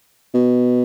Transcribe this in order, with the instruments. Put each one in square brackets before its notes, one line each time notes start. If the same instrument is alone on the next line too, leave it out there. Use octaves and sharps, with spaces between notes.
[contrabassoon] B2